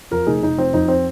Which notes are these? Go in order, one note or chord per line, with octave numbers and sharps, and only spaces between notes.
F2 F4 A#4
F1 D#4 G#4
F1 D#4
F3 C4
F2 D#4
C4